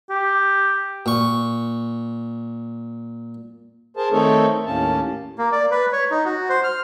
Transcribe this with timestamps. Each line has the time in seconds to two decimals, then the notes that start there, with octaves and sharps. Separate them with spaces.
0.10 G4
1.06 A#2 C#6
3.97 G#4 A#4 C5 A5
4.12 D#3 A3 C4 D#4 A4 C#5
4.66 D#2 A2 A#3 C#4 A5
5.38 A#3
5.52 D5
5.71 B4
5.92 C#5
6.11 D#4
6.25 F#4
6.49 C5
6.64 F6